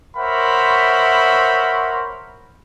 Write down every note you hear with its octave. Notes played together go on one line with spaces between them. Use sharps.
A#4 C5 C#5 E5 F#5 B5